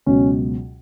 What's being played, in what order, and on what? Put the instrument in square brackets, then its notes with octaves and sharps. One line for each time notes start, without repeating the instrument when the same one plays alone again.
[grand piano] C#2 B2 F#3 C#4